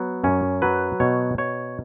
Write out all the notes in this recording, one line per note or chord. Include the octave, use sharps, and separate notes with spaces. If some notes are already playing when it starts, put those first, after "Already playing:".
Already playing: F#3 B3
F#2 C#4
F#3 B4
B2 C#5
B2 C#5